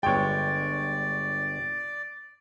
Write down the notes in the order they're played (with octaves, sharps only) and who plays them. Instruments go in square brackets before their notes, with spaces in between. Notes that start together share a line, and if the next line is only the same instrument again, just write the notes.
[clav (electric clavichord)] G1 G#3 [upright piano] C#5 G5 [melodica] D5